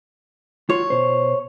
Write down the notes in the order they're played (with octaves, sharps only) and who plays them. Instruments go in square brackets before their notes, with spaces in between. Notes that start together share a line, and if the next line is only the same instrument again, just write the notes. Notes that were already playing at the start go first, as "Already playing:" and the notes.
[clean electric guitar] F4 F#4 [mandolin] C#5
[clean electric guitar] B2 C5